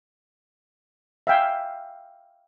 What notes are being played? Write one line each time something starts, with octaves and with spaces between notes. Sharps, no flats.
E5 F5 G5 G#5